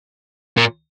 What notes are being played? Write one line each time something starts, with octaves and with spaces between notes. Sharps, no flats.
A#2